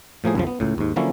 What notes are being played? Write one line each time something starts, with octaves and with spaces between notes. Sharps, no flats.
A2 F3 A#3 G#4
C2 F#2 C#3 F3
B3
C#2 A2
D#2 G#2
D3 F3 F#3 A#3 C#4 E4